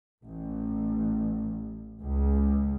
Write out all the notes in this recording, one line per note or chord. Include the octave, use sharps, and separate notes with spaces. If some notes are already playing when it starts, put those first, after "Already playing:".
A1
C#2